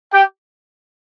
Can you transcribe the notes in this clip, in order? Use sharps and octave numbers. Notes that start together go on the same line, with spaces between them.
G4 G5